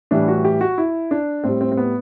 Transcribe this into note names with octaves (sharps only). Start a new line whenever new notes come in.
A2 E3 G3 D4
F#4
G4
F#4
E4
D4
A2 G3 C4
C4
C4
B3